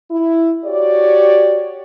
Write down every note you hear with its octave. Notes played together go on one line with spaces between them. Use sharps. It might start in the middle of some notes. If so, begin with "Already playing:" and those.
E4
F#4 G4 C#5 D5